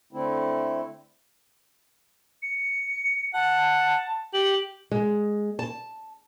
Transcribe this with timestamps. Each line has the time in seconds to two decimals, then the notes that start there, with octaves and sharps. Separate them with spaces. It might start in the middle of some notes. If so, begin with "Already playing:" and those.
0.13 D3 A3 C4 E4
2.42 C#7
3.34 F#5 A5
4.34 G4 F#7
4.91 G#3
5.59 A5